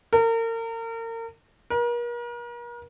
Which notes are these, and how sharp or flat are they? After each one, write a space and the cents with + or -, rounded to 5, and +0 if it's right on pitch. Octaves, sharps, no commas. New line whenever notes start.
A#4 -35
A#4 +40